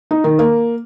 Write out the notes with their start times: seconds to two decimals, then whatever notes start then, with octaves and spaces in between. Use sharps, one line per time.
0.11 D#4
0.24 D#3
0.39 A#3